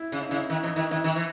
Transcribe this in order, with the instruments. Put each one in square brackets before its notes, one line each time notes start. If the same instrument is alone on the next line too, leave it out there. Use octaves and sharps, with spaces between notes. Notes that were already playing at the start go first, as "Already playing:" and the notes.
Already playing: [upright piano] E4
[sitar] C#3
[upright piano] D#4
[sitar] C#3 [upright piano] E4
[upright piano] D#4
[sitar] D#3 [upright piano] E4
[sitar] E3 [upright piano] D#4
[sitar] D#3 [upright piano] E4
[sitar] D#3 [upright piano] E4
[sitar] D#3
E3